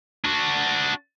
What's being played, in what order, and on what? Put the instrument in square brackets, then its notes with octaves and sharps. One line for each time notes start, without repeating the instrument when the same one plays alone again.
[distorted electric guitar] D4 F#4